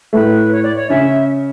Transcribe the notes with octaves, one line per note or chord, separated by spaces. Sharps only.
A2 A3 B4
C#5
D5
C#5
C#3 C#4 E5